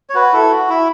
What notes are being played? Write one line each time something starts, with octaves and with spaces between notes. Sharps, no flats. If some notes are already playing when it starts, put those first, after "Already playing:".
C#5
F#4 B4
E4 A4
F#4
E4